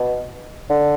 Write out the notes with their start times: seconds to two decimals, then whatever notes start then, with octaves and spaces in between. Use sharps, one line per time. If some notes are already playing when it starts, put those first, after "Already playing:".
Already playing: B2
0.70 D3